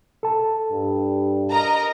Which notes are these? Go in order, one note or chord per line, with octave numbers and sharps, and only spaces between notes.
A4 A5
G2
A#4 D#5 A#5